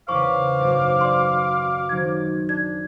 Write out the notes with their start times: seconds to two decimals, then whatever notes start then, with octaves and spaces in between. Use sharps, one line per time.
0.09 E2 C#3 B4 C5 F5 C#6 D6
0.59 G#1 F#2
1.01 D5 C6
1.89 D#3 F#3 C4 G#6
2.49 D4 G#6